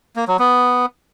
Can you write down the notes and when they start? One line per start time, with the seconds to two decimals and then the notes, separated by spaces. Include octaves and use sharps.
0.16 A#3
0.28 F#3
0.39 B3